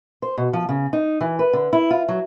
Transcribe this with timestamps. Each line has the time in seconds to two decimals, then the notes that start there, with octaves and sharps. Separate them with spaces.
0.22 C5
0.37 B2
0.53 F3
0.69 C#3
0.93 D#4
1.21 E3
1.39 B4
1.53 D3
1.73 E4
1.91 F4
2.08 F#3